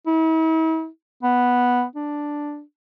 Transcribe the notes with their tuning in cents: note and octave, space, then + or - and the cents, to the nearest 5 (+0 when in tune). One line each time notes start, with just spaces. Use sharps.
E4 -45
B3 -5
D4 +0